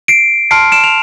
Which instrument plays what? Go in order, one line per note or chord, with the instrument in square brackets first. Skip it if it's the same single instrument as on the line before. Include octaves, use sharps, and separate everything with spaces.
[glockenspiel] C7 D7
A5 C6 F6 C7 D7
D7 E7
F7